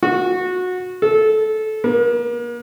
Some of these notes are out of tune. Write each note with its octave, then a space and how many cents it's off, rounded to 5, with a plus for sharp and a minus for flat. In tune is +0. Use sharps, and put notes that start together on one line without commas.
F#4 -20
A4 -20
A#3 +40